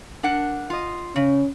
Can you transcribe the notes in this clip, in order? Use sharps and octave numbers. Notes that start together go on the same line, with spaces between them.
D4 A#4 F#5
F4 D#5
C#3 C#4